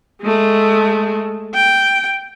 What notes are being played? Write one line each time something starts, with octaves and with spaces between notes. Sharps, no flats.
G#3 A3
G5